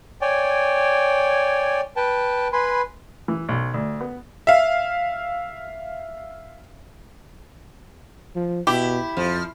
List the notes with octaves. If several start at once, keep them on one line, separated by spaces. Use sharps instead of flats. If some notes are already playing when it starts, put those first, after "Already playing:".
C#5 D5 G5 G#5
B4 G5 A5
B4 G#5 B5 C6
E3
B1
D2
B3
E5 F5
F3
B2 E4 G4
F2 F3